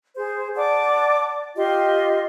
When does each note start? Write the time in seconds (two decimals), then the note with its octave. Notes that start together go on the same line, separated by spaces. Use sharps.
0.16 G#4 C5
0.56 D5 F#5 A5 D6
1.56 F4 G4 D#5 C6